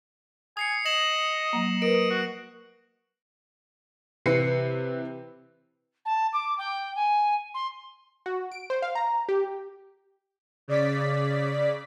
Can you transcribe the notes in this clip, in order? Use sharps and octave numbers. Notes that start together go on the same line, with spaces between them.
G#5 D#6 C7 C#7
D#5 A#6 E7 F#7
F#3 A#3
A#4 B4 D#5 D7
F#4
C3 E3 C4 B4 C7 C#7
A5
D6
G5
G#5
C6
F#4
D7
C5
F5
A#5
G4
C#3 D5 B6